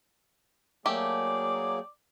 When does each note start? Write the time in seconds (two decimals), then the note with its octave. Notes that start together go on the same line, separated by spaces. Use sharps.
0.86 F#3 A3 A#3 G4 G#4 D5